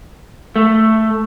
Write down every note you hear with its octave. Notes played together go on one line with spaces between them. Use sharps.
A3